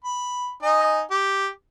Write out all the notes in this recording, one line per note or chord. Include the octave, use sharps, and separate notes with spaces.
B5
D#4 D#5 G#5
G4